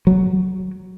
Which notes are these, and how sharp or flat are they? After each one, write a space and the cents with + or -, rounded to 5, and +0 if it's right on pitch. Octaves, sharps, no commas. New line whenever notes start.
F#3 +5